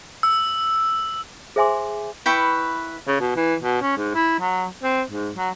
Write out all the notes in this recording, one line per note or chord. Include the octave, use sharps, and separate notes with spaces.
E6
G#4 C5 E5 G#5 C6 D6
E4 B4 G5 C#6
C#3
B2
E3
B2
C#4
G#2
E4
F#3
C4
G#2
F#3